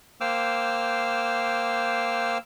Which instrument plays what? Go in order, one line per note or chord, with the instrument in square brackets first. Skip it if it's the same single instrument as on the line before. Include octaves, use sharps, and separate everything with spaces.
[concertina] A#3 C5 G5 D6 E6 F6